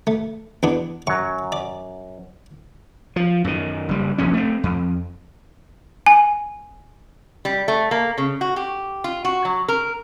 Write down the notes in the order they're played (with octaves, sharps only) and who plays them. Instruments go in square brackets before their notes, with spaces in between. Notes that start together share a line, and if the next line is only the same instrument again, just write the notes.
[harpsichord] A3
E2 B3 D4
[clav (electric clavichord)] F#2 F#3 [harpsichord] C#6
[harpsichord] D5
[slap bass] F3
F#2 D#3
F#1 G3
F1 A#1 E2 C#4
A3 C4
F2
[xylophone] G#5
[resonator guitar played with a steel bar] G3
A3
A#3
C#3
F#4
G4
F4
F#4
F#3
A#4